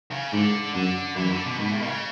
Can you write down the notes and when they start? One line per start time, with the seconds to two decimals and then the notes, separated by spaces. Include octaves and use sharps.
0.11 C#3
0.33 G#2 D3
0.75 F#2 D3
1.16 F#2 E3
1.31 D3
1.45 B2
1.58 G#2 B2
1.73 A2
1.81 B2
1.87 C#3